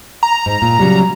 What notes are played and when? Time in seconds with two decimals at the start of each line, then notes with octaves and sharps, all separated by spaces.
0.23 A#5
0.46 G#2
0.62 A#2
0.80 C#3 F#3 G3